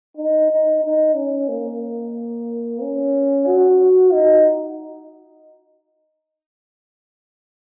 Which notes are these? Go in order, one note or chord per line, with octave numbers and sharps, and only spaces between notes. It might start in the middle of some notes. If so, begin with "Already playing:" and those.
D#4
D#4
D#4
C#4
A#3
C#4
F#4
D#4